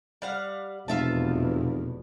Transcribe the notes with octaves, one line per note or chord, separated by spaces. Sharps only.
G3 F5 F#5
F1 E2 B2 F4 E5 A5